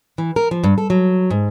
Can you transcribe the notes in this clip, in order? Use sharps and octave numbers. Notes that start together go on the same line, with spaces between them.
E3
A#4
F3
G2
A4
F#3
G#2